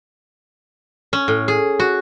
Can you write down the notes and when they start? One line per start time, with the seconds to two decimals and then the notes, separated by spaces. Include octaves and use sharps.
1.13 C#4
1.28 A2
1.48 G#4
1.80 F#4